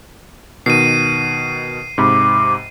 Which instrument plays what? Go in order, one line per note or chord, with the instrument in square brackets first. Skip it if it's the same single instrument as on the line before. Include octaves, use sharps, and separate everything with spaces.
[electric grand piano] B2 D#3 [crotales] C7 D#7
[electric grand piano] G#2 C3 B5 [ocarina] D6